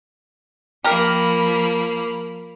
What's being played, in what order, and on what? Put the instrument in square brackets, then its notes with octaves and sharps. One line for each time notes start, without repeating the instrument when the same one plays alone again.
[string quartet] F3 A#3 B5 [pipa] G4 A#4